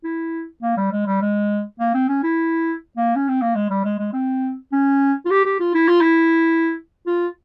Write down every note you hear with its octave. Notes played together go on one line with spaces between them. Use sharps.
E4
A#3
G3
G#3
G3
G#3
A#3
C4
C#4
E4
A#3
C#4
C4
A#3
G#3
G3
G#3
G#3
C4
C#4
F4
G4
G4
F4
E4
F4
E4
F4